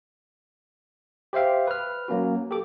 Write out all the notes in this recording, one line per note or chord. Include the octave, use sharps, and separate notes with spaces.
G4 C5 E5 F5 G5
B4 F6
F#3 A#3 C#4 F#4
G4 A4 D6